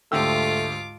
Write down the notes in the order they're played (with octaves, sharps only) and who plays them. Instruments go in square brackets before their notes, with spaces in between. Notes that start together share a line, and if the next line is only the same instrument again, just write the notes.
[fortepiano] D2 G4 E6 [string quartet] G#2 F4 D6 [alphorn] A3